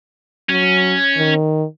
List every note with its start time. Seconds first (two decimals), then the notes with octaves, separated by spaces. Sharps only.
0.49 F#3 C#4
1.17 D#3